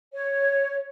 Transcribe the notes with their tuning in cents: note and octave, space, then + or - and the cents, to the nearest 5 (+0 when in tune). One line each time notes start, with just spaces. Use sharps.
C#5 +0